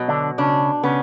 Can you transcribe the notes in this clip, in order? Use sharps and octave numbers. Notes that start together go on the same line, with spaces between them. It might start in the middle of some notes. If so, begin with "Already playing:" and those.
Already playing: B2 F#3
D3 D4
C#3 C#4 D4
C#3 B3 C#4